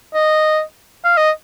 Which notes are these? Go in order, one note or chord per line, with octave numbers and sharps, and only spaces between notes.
D#5
F5
D#5